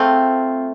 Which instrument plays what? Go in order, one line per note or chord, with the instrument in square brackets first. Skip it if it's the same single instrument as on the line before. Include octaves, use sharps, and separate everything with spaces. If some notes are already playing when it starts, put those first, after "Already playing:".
Already playing: [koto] A3 C4 F4